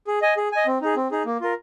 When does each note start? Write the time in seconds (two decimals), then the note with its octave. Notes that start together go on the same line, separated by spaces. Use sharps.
0.07 G#4
0.22 D#5 G#5
0.37 G#4
0.52 D#5 G#5
0.66 C4
0.81 D#4 G#4
0.96 C4
1.11 D#4 G#4
1.26 A#3
1.41 F4 A#4